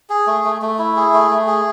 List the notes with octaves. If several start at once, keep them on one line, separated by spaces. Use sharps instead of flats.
G#4
A3
A3
A3
E4
G#4
A3
A3
G#4